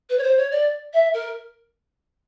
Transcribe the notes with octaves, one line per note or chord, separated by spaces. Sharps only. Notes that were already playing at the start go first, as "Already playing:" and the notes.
B4
C#5
C5
C#5
D5
E5
A#4